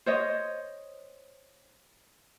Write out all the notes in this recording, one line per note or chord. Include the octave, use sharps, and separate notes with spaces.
C5 C#5 D#5